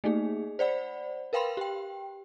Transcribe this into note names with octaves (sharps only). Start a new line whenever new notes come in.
A3 A#3 D#4 G#4
C5 D5 F#5 B5
A#4 B4 F5 G5 B5 C6
G4 G5